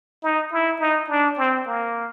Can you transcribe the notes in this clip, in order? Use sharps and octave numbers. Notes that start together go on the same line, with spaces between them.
D#4
E4
D#4
D4
C4
A#3